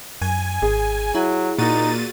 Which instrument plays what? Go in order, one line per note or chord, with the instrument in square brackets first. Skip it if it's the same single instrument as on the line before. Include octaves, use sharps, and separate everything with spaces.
[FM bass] F#2 [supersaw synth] G#5
[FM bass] G#1 [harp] G#4
[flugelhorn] F#3 [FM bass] E4
[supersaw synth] A#2 A6 D#7 [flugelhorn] D#4 [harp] F#4